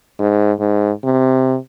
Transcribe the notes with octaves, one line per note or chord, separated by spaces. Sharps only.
G#2
G#2
C3